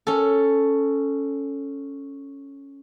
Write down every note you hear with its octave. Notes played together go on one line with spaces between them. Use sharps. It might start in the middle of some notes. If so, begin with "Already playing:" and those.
C#4 A4